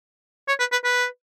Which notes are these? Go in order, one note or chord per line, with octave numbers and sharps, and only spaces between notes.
C#5
B4
B4
B4